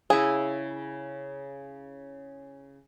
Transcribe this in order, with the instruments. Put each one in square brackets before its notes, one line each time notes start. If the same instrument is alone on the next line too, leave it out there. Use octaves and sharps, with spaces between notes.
[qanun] C#3 E4 [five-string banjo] G#4